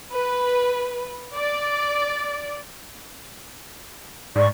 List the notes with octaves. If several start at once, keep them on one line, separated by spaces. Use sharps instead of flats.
B4
D5
G#2 D5 C#6